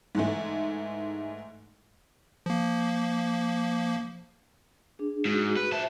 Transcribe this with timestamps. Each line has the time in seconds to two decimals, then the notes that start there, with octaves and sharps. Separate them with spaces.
0.15 G#2 E3 G#3 A3
2.46 F3 A#3
4.99 D4 G#4
5.25 G#2 F#4 G#4
5.57 B4
5.72 A#2 C5 E5 A5